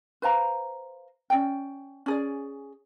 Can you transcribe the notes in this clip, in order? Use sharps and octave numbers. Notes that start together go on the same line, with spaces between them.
B4 C5 F5 A#5
C#4 D#4 D5 G5
C#4 G#4 D5